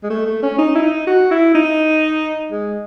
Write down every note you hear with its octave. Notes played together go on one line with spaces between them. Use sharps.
G#3
A3
A3
C#4
D#4
E4
D#4
F#4
E4
D#4
G#3